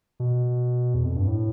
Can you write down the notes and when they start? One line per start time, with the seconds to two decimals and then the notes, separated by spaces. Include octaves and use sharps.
0.20 B2
0.94 E2
1.05 F2
1.16 G2
1.28 A2